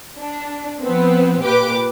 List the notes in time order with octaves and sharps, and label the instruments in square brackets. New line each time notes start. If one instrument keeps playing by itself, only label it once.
[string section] D4
F3 B3 C4
A#2 G4 B4 D6